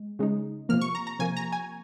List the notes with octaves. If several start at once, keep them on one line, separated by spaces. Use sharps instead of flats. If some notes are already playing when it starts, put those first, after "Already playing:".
Already playing: G#3
C#3 G#3 D#4
C3 F3 A#3 F6
C#6
A#5
A#5
C3 F3 A#3 G#5
A#5
G#5